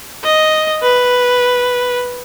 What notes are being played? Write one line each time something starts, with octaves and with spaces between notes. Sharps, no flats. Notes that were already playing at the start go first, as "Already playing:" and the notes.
D#5
B4